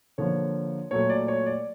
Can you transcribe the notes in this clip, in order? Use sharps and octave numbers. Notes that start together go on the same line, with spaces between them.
D3 F3 A#3 C#5
A#2 F#3 A3 C#5
D5
C#5
D5